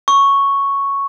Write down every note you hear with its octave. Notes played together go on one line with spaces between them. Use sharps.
C#6